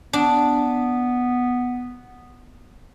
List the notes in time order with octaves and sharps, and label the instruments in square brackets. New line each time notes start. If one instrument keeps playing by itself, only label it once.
[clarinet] B3 [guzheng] D4